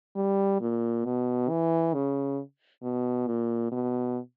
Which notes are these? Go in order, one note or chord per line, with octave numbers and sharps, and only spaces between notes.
G3
A#2
B2
E3
C#3
B2
A#2
B2